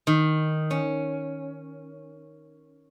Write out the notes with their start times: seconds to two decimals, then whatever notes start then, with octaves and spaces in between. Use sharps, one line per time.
0.07 D#3
0.71 C#4